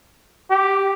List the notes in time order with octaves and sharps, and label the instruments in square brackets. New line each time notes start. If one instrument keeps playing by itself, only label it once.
[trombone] G4